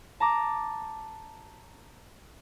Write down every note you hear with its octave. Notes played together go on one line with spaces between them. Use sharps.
A5 A#5 D6